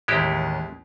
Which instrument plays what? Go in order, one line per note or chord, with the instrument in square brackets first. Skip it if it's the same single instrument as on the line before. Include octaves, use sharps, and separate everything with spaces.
[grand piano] A1 D#2 [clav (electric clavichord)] G#3 E4 G4